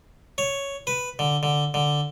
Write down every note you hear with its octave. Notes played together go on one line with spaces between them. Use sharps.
C#5
B4
D3
D3
D3